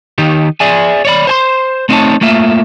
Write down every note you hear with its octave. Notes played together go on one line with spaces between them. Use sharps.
D#3 D#4 G4
G#4 D5 E5 G#5
C#5 D5 B5
C5 G#5 C6
A3 C4 D#4 E4 C#5 A5
A3 A#3 F4 E5